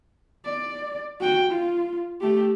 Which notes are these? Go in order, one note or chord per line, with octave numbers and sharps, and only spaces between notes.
D5
F#4 G5
F4
A3 G4